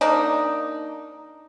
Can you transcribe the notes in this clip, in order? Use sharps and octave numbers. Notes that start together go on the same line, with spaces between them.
A#3 D4 D#4